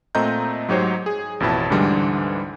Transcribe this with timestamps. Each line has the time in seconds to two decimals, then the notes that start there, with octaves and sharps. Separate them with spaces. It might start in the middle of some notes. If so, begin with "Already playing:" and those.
0.15 A#2 A3 C4 D#5 A#5 G6
0.68 G#2 F#3 D#4 G4 C5 C#5
1.06 G#4
1.40 A1 F2 B2 E4 A5
1.70 D2 G#2 D3 E3 G3 G#3